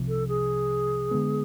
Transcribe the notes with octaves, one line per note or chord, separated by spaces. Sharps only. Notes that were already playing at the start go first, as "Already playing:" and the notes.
Already playing: C2 C3 F3
A4
G#4
D3 G#3 B3